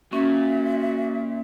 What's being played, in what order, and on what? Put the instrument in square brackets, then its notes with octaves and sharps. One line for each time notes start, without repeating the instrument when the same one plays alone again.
[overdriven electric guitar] A#2 [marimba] C#4 [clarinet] F#4 [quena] E5